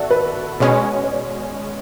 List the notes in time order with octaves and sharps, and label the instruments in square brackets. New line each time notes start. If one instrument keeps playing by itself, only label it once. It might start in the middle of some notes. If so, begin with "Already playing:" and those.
Already playing: [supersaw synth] F#4 A4 [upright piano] D5 E5
[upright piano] B4
[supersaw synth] B2 G#3 C#4 [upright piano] C#5
[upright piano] C#5
D5